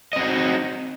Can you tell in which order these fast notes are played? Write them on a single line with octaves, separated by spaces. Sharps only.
D#5 C4 F#4 D#4